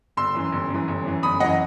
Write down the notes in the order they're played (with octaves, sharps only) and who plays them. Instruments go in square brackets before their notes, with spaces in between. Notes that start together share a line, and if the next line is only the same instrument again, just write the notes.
[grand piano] G1 C6 E6
F#2 E3
G1
F#2 E3
G1
F#2 E3
G1 B5 D#6
F#2 E3 D#5 F#5